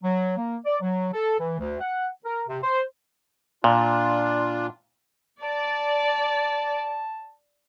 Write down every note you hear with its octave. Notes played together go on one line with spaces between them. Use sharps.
F#3
A#3
D5
F#3
A4
E3
D2
F#5
A#4
C3
C5
A#2 D4 F4
D5 A5